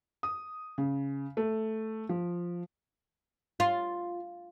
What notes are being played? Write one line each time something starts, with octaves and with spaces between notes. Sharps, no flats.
D#6
C#3
A3
F3
F4